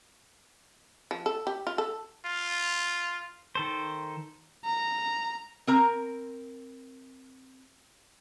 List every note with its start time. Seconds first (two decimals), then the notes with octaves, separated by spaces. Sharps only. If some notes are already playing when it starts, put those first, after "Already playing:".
1.11 F3
1.26 A4
1.47 G4
1.67 F4
1.78 A4
2.25 F4
3.55 D#3 A4 C5
4.65 A#5
5.67 C4 A#4 A#5